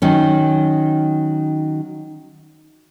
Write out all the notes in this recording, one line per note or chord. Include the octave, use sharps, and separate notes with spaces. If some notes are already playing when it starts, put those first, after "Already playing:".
D#3 F#3 C#4